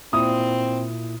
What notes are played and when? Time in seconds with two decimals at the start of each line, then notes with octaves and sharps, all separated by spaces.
0.13 A#2 C4 E4 D#6